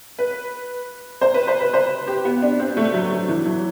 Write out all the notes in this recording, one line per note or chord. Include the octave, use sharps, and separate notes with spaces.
B4
C5
B4
C5
B4
C5
G4
B3
D4
C4
A3
F#3
F#3
E3
F#3